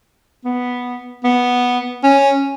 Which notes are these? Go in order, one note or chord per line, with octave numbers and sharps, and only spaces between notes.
B3
B3
C#4